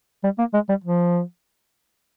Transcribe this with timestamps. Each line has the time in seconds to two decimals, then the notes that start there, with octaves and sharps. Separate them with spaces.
0.24 G3
0.39 A#3
0.54 G#3
0.69 G3
0.84 F3